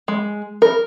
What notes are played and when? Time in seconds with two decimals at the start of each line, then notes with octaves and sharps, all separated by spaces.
0.08 G#3
0.62 A#4